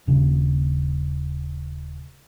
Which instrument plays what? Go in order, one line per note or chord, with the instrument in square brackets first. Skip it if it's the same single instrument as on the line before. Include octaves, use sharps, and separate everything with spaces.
[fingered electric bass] D#1 C#3